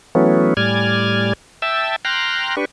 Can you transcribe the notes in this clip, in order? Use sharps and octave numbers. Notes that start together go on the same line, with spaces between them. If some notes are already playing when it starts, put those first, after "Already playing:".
E3 F#3 A3 B3 C#4
A2 G3 D5 G#5 F6 G#6
E5 G5 A5 E6
G5 A#5 C6 F6 F#6
D4 G4 B4 C#6